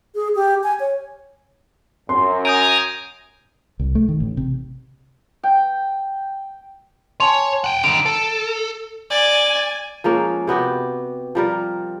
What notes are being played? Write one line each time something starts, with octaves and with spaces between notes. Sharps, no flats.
G#4
G4
G#5
C#5
F#2 C6
G#5 A#5 D#6 G6 D7
C2
A3
D#3
A1
C3
G5
C#5 G#5 A5 C6
F#5 G5
D3 D#3 D7
A4
D5 G#5
F3 G#3 A#3 C#4
C3 B3 F#4 G4
F3 G3 A#4